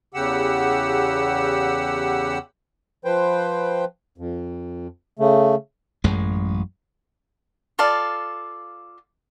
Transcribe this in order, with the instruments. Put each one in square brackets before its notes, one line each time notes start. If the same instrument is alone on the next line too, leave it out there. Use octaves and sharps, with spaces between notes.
[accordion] E2 C#3 G4 F#5 E6
[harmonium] F3 B4 C5 G5
F2
C#3 A3
[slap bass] A1 F#2 G#3
[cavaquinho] F4 A4 D5 F5